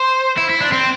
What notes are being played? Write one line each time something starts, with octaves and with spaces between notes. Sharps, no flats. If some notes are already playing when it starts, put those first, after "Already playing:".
Already playing: C5
E4
E4
D4
C4